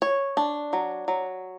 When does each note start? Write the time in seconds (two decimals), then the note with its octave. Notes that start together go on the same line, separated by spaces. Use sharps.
0.02 C#5
0.37 D4
0.73 F#3
1.08 F#3